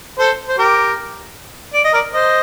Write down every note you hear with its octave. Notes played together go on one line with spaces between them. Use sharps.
A4 C5
C5
G4 A#4
D5
D#5
A#4 D5
C5 D#5